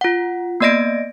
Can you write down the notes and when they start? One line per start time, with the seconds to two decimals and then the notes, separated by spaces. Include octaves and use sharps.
0.01 F4 F#5
0.60 A#3 B3 D5 D#5 A#6 D7